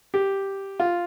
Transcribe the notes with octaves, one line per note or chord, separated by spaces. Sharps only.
G4
F4